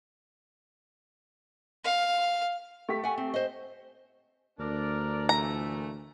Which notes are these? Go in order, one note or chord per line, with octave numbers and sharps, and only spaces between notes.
F5
A3 G4 B6
F#5 G#5
C4
C5 D#5
D2 D4 A#4 D5
A#2 E3 A3 A#5